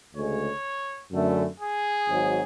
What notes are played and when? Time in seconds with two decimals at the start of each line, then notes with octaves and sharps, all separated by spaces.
0.15 D2 C#3 G#3 C#5
1.12 F#2 D3 A3
1.60 G#4
2.08 G#1 G#2 F#3